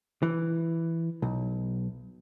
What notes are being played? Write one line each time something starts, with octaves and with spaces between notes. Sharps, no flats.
E3
B1